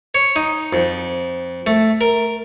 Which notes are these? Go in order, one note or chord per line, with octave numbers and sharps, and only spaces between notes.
C#5
D#4
F2
A3
A#4